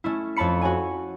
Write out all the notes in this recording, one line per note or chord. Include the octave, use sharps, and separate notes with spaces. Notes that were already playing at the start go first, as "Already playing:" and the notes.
A3 C#4 E4
F2 C#5 A5 B5 C#7
F#4 C#5 G#5